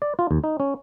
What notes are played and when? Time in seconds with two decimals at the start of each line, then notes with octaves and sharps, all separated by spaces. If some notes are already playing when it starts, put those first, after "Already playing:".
0.02 D5
0.19 F4
0.31 D#2
0.44 D#4
0.60 C#4